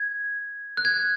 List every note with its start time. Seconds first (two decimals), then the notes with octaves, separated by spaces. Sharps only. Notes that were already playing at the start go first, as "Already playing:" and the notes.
Already playing: G#6
0.77 F#6
0.85 G#6